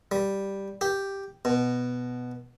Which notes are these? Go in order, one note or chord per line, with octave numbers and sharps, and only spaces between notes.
G3
G4
B2